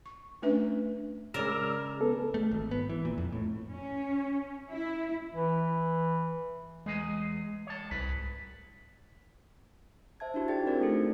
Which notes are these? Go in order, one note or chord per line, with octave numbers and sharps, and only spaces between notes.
C#6
A3 C#4 D4 B4 E5
C#3 G#3 A#4 D5 E6 F6
B3 A4
A3
G#1
B3
E3
A#2
F2
A2
C#4
E4
E3
E2 G#3 G#4 D#5
C#5 A5
C2 G#2 B4
C5 E5 A5 G#6
D4 E4 F#4 G4
D#4 G#4 D5 G5 G#6 A6
C4 D4 F#4 A#4 C5 D5
A3 C#4 D#4 A4 C#7